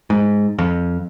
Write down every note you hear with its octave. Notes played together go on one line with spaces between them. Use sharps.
G#2
F2